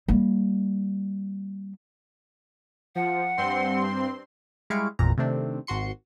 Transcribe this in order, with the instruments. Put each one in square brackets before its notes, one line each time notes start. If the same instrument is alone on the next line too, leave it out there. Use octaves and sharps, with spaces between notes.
[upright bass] G3 A#3
[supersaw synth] F3 [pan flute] F#5
[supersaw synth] G2 C4 C6
[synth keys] G3 G#3 E4 F5 C#6 D7
G#1 E2 A#2 A#5
C3 D#3 A3 C4 D4
G#1 F#4 C6 C#7